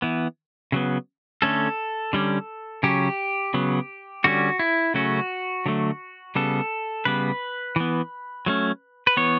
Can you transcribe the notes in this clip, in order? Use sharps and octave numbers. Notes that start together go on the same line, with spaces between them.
E3 B3
C#3 F#3 B3
D3 A3 C#4 A4
D3 G3 C#4
C#3 F#3 C#4 G4
C#3 F#3 B3
D3 G3 C#4 F#4
E4
C#3 F#3 A3 C#4 F#4
D3 F#3 A3
C#3 G3 B3 A4
C#3 G3 B3 B4
E3 B3
F#3 A3 C#4
B4
E3 B3 C#5